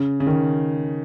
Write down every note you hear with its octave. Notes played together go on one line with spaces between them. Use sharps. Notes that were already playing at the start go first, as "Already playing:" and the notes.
Already playing: C#3
C#3
D#3